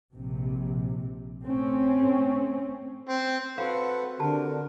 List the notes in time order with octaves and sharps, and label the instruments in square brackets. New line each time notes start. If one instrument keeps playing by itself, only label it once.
[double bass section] A#1 C3
A3 C4 C#4
[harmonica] C4
[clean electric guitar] C4 F#4 C5 [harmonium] A4 B4 F#5 [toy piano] F5
[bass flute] D3 [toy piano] G4 A5 [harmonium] A#4